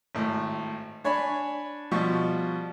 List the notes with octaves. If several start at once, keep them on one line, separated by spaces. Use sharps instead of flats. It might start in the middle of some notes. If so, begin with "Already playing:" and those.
G#1 A2
D4 C#5 G#5 B5
B2 F3 G3 C#6